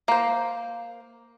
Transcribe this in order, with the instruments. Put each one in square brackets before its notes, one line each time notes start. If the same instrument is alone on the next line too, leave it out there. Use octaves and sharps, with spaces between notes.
[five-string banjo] A#3 C5